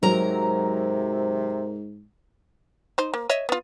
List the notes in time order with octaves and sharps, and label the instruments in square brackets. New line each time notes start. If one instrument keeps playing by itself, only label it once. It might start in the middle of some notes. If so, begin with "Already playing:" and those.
[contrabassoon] G#2 [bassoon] C3 [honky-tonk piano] F#3 [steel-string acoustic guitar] A#4 A#5
[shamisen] D#4 C5
A#3
C#5 D#5 E5
B3 F4